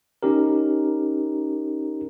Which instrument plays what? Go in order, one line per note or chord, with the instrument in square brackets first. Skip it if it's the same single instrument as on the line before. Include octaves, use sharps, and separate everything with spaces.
[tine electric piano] C#4 D#4 G4 A#4